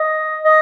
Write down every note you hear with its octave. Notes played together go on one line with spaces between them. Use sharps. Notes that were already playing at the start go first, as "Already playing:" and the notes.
Already playing: D#5
D#5